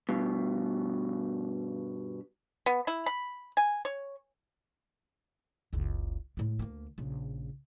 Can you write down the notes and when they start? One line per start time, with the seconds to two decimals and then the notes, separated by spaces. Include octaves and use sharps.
0.09 G2 B2
2.66 B3
2.87 E4
3.06 B5
3.57 G#5
3.85 C#5
5.73 F#1 C#2
6.37 A2 G#3
6.59 D2 A#3
6.98 A#1 C#3